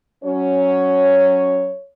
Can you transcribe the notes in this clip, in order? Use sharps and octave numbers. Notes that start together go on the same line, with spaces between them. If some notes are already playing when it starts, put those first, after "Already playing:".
F#3 C#4 C#5